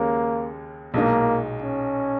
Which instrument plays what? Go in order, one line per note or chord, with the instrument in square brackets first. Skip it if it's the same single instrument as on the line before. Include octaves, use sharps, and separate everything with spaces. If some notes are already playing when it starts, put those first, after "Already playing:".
Already playing: [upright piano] D#2 C#3 G#3 C#4 [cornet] A#3
[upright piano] B1 A#2 G#3 D#4 [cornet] A#3
[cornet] C#4